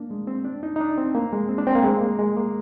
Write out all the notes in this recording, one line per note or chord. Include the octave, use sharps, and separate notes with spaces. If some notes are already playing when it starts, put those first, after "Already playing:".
Already playing: A#3 D4
G#3
C4
D4
D#4
D#4
D4
C4
A#3
G#3
C4
D4
C4
A#3
G#3
A#3
G#3
A#3